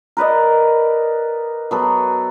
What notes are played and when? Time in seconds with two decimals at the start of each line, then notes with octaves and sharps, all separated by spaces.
0.17 A#4 B4 D5 D#5
1.71 F#3 B3 A4